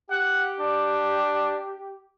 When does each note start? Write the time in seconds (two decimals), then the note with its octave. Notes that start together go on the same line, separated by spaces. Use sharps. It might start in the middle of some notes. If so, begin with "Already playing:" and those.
0.10 G4 F#5
0.60 D4